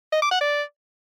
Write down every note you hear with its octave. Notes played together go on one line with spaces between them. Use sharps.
D#5
D6
F#5
D5